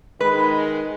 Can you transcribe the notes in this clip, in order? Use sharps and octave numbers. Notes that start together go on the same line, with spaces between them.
D#3 G#3 B4